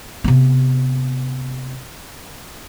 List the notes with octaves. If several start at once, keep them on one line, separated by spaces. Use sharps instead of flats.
C3 B3